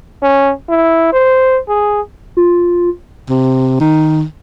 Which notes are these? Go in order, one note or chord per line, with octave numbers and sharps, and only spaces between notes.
C#4
E4
C5
G#4
F4
C3
D#3